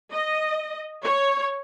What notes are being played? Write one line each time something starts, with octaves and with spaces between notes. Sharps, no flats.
D#5
C#5